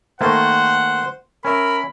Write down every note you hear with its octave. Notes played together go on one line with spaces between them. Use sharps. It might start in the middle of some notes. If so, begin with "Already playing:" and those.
D#3 A3 A#3 C5 F#5
C#4 A#4 E5 B5